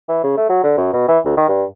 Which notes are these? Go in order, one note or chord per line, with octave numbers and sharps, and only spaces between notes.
E3
C#3
A3
F#3
D3
F#2
B2
E3
D2
D#3
G2